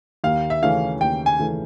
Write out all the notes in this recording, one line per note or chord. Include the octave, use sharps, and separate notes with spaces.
D#2 F5
E5
C#3 E3 A3 C#4 F5
D#2 G5
G#5
C#3 E3 A3 C#4